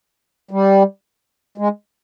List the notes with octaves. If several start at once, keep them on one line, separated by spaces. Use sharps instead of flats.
G3
G#3